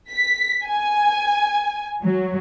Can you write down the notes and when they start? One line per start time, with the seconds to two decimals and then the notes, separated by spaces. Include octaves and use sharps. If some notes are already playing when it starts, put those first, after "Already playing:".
0.10 B6
0.66 G#5
2.03 F#3